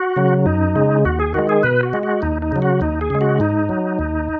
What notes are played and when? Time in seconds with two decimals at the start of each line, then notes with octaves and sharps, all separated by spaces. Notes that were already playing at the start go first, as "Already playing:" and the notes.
Already playing: F#4
0.16 C#3 F#3
0.46 F#2 D#4
0.76 C#3 G#3
1.05 D#2 F#4
1.20 G#4
1.34 D#3 G#3 F#4
1.49 G#4
1.63 B2 B4
1.83 F#4
1.93 G#3
2.03 F#4
2.22 D#2 D#4
2.42 D#4
2.52 C#3 F#3
2.62 F#4
2.81 D#2 D#4
3.01 G#4
3.10 C#3 G#3
3.21 F#4
3.40 G#2 D#4
3.69 F#3
3.99 D#2